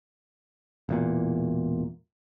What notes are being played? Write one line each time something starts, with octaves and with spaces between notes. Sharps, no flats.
E1 E2 A#2